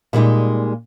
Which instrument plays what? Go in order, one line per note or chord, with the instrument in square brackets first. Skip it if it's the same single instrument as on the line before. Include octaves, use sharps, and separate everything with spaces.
[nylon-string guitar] A#2 G3 G#3 D#4